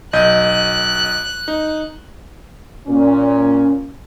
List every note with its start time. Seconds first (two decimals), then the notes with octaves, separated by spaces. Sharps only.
0.13 B1 D#5 F#6 G6
1.48 D#4
2.87 A#2 C#4